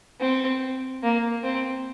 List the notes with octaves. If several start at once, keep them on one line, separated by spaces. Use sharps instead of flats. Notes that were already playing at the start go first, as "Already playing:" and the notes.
C4
A#3
C4